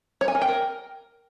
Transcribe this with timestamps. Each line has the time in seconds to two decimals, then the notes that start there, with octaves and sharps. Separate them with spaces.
0.21 C#5
0.28 G#5
0.35 A#4
0.42 G5
0.48 A#4